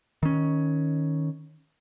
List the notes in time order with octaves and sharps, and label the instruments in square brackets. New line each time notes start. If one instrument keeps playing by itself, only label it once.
[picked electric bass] D#3 C#4